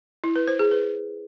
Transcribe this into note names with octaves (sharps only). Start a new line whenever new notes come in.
E4
B4
C5
G#4
B4